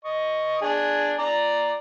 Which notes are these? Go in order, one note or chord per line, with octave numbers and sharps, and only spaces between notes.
D#5 C#6
D4 G#4
D5 A#5